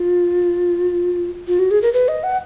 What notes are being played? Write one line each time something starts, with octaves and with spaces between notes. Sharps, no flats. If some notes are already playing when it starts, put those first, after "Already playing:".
Already playing: F4
F4
F#4
G#4
A#4
B4
D#5
F#5